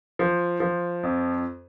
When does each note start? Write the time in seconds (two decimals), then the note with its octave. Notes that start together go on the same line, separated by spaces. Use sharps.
0.19 F3
0.60 F3
1.03 F2